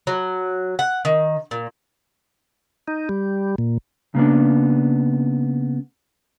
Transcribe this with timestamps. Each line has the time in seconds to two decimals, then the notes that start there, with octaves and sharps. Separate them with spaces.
0.07 F#3
0.79 F#5
1.05 D#3
1.51 A#2
2.88 D#4
3.09 G3
3.58 A#2
4.15 C#3 A#3 B3 D4